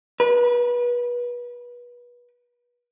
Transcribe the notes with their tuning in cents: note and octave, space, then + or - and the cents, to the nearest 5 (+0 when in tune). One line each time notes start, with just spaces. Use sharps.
B4 -30